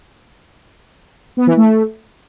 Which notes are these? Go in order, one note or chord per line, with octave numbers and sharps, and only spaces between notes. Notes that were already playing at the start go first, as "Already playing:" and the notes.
B3
E3
A3